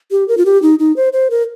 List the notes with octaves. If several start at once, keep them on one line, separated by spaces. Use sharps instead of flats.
G4
A#4
F4
G4
D#4
D#4
C5
C5
A#4